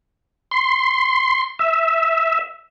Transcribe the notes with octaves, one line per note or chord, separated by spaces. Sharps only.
C6
E5